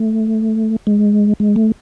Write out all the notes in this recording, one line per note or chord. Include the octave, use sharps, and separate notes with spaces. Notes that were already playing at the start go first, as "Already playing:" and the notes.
Already playing: A3
G#3
G#3
A3